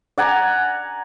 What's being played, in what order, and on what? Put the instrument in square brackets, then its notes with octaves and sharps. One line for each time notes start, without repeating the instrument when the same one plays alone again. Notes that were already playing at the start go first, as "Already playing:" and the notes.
[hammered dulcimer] D5 F#5 G#5 A#5